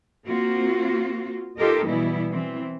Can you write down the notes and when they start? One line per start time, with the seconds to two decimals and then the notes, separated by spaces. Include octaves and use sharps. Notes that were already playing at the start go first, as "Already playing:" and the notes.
0.25 A#3 C4 F4 F#4
1.57 D#4 F4 G4 A4 A#4 D#5
1.86 B2 E3 G3 B3 E4
2.31 E3 C4